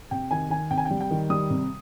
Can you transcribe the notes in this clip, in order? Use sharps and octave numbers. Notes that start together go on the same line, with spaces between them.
C3 G5
D#3 G#5
D#3 G#5
C3 G5
G#5
G3 G5
G5
D#3
G3 D#6
C3